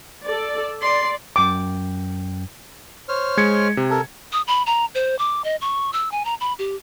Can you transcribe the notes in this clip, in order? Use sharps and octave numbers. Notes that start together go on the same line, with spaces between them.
A4 D5
D5 C6
F#2 G5 D6
C5 C#5 F6
G#3 G#6 C#7
C3
A4 A#4
D#6
B5
A#5
C5
D6
D#5
C#6
E6
G#5
A#5
B5
G4